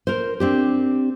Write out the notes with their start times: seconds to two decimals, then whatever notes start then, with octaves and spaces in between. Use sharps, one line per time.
0.07 A#4 C5
0.40 C4 D4 G4